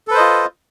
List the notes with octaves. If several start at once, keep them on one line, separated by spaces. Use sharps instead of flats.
F4 A4 B4 C5 D#5